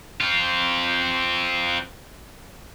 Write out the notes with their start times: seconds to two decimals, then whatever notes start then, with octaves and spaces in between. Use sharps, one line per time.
0.21 C4 F4